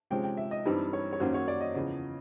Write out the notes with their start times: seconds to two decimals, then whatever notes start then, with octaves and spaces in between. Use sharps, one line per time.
0.10 C3 F3 G#3 C#4 G5
0.24 G5
0.37 E5
0.51 D#5
0.66 G2 E3 G3 C4 D#4
0.93 C#5
1.13 C#5
1.20 F#2 D#3 F#3 A#3 C#4 C5
1.34 C#5
1.48 D5
1.61 D#5
1.75 E2 C#3 F3